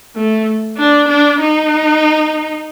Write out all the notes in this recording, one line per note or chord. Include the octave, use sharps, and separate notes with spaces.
A3
D4
D4
D#4